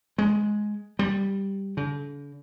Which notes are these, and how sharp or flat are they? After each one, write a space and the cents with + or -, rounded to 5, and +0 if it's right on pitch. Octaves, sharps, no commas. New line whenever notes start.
G#3 +10
G3 +0
D3 -45